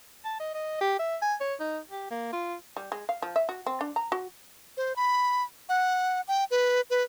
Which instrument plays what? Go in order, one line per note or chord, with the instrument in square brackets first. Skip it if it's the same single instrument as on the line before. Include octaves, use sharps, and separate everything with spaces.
[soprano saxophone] A5
D#5
D#5
G4
E5
G#5
C#5
D#4
G4
A#3
F4
[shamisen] G3
G#3
F5
F3
E5
F#4
C4
D4
A#5
F#4
[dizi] C5
B5
F#5
G5
B4
B4